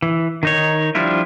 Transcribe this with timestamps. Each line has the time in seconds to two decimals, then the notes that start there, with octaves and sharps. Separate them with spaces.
0.02 E3
0.43 D#3 D#4 C#5
0.95 F3 G3 D4 E4 F4